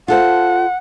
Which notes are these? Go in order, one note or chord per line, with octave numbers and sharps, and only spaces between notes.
F4 A4 C5 F#5